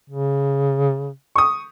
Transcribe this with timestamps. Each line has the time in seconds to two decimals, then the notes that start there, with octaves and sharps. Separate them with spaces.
0.10 C#3
1.36 C#6 D#6